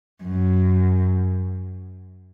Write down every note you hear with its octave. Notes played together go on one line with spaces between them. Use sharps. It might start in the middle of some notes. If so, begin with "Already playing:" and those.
F#2